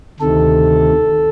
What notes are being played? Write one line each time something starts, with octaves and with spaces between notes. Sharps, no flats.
D2 C3 D#3 A4